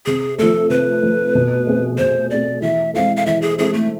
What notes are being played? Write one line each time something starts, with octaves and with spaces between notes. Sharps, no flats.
C3 G#4
F3 A3 A4
C3 B4
F3 A3
B2
A3 C4 G#4
B2 C5
A3 C4 G#4 D5
E3 E5
G#3 C4 E4 A4 F5
F5
E3 E5
G#4
G#3 C4 E4 G#4 A4
A3